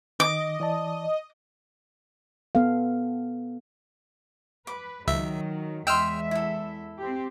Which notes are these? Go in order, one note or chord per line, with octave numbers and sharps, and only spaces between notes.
D#3 D#5 D6
E3 D5 A5
B3 A4 F5
B4 D6
C#2 D#3 F#3 E5
E2 G#3 D#5 E5 G5 C6 E6 F6
E4 A4
C4 G4